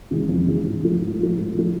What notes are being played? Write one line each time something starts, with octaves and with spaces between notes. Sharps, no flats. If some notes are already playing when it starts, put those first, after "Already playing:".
C#3 E3 G#3
F2
C#3 E3 G#3
G#2
F3 A3
G#2
F3 A3
G#2
F3 A3